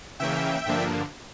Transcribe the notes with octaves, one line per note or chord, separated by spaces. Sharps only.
C#3 E3 A#3 C#4 E5 G5
G2 D3 F3 A#3 D4